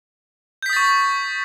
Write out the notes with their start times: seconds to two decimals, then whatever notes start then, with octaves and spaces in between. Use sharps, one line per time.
0.62 G6
0.66 B6
0.69 D#6
0.73 A6
0.76 C#6